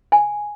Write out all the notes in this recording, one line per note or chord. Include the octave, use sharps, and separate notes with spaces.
G#5